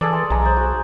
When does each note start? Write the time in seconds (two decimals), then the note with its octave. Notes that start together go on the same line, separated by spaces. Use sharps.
0.01 E3 G#4 A4 D5
0.13 C6
0.30 B1 G#3 G#4 A#5
0.42 C5 G#5
0.57 F#4